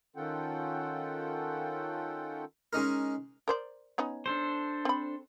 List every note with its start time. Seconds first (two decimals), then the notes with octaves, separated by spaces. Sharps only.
0.16 D#3 C#4 F4 A4 F#5 G5
2.73 G#3 C#4 D#4 A#4
3.48 A#4 C5 D5
3.98 B3 C#4 D#4
4.26 D4 A4 C5
4.85 C4 B5